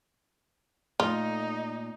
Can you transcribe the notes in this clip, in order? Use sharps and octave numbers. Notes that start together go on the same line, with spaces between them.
A#2 A3 D#4 F4